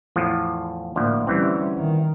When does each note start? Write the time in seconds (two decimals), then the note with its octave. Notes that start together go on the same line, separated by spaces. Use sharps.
0.16 E2 A2 F3
0.96 D2 A2 F3 A#3
1.27 D2 E3 G3 C4 C#4
1.78 D#3